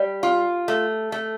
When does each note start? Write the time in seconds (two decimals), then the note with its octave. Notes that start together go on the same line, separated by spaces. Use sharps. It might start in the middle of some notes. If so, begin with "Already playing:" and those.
Already playing: G3
0.23 F4
0.68 A3
1.12 A3